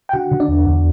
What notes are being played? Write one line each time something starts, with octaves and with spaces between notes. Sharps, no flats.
G5
D3 F#4 F#5
D3
D4 D5
E2
E2